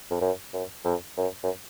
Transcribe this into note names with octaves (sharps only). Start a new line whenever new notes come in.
F2
F#2
F#2
F2
F#2
F#2